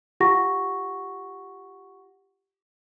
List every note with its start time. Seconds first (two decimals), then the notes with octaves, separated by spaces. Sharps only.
0.20 F4 G4 F#5 C#6 A#6